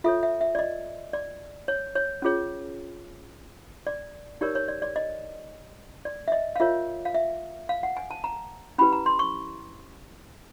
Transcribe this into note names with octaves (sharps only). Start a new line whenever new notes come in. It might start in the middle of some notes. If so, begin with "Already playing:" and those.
F4 A4 C#5 E5
E5
E5
D5
D#5
D5
C#5
C#5
C#4 F4 G#4 C#5
D5
D#4 G4 A#4 C#5 D5
C#5
D5
D5
D#5
D5
E5
D#5
F5
F4 A#4 C#5 E5
F5
E5
F5
F#5
G#5
A5
A#5
C#4 E4 G4 B4 B5
A#5
C6
C#6